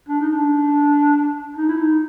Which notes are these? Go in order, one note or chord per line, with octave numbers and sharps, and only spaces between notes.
D4
D#4
D4
D#4
E4
D#4